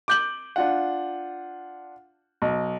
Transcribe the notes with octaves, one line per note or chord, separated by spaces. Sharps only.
D6 G6 F#7
D4 F4 F#5
B1